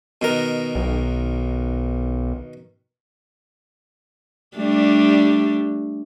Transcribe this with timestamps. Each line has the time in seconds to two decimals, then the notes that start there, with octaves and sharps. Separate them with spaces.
0.21 B2 D#3 A#4
0.75 B1
4.57 G3 A3 D4